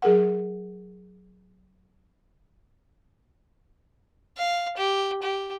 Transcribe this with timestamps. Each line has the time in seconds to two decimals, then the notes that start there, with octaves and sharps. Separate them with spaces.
0.02 F#3 G#4 A#4 F#5
4.38 F5
4.77 G4
5.22 G4